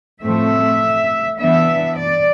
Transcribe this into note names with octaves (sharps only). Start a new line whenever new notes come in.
A2 F3 A3 C4 E5
E3 B3 D4 E5
D5